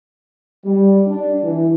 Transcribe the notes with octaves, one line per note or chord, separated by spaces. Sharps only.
G3
D4
E3